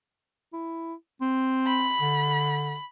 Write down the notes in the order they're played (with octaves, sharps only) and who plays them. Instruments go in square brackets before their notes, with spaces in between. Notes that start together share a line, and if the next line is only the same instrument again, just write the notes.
[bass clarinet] E4
C4
[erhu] B5
[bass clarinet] D3